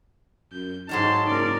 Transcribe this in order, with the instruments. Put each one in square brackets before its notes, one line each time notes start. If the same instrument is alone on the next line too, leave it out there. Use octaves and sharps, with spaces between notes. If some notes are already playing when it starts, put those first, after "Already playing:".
[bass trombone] F#2 [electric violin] G6
[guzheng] G#2 F#3 F5 [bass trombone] D#4 [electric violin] A5 C6
[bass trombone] F#1 [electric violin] A#4 D5